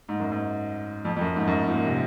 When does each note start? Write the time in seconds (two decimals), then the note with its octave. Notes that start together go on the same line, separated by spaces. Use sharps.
0.09 G#2
0.20 F#2
0.31 G#2
1.05 F2
1.16 F2
1.21 F#2
1.36 G#2
1.47 F#2
1.52 G#2
1.63 G#2
1.69 A#2
1.85 C3